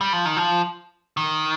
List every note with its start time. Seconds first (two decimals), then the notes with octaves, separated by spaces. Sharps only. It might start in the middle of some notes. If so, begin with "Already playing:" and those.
0.01 G3
0.13 F3
0.25 D#3
0.37 F3
1.17 D#3